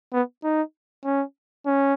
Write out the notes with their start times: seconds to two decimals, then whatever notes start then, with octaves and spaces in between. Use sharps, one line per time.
0.13 B3
0.43 D#4
1.05 C#4
1.66 C#4